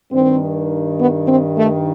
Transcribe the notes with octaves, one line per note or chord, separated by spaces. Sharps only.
G2 D#3 C4
B3
C4
A3